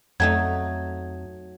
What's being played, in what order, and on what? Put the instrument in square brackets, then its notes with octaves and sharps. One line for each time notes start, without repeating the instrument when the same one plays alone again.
[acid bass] F2 [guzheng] F#3 A3 D#4 [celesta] G#6